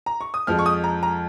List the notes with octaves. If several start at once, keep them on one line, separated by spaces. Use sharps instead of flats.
A#5
C#6
D#6
F2 F3 G#3 F6
C#6
D#6
A#5
A#5